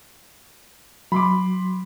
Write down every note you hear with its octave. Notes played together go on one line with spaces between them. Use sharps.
F#3 B5 C6 D6